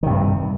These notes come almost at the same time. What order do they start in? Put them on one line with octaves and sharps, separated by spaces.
D#3 C3 G2